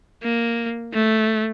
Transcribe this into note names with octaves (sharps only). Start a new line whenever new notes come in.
A#3
A3